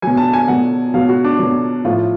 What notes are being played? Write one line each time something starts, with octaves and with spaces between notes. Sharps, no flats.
B2 F#3 G#5
A5
G#5
B2 F#3 F#5
B2 F#3 F5
F#4
D4
B2 F#3
A2 F3 F4